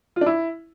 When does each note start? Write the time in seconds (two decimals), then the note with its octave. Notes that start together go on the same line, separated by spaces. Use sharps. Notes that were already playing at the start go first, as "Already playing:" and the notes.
0.16 F4
0.21 D4
0.26 E4